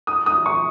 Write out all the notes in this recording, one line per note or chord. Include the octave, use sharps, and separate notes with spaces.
D#6
D#6
C#6